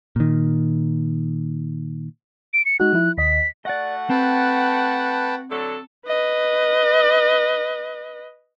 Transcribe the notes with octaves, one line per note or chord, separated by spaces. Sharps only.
A#2 D#3
D7
C#7
G#3 D#4 F#4 F#6
F3 E4
D#2 D#5 B6
A3 F#4 D5 D#5 F#5
C4 B4 G5 A5
D3 F#3 A4
B4 D#5